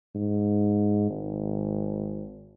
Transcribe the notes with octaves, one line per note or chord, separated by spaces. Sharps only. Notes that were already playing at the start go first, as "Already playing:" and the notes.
G#2
G#1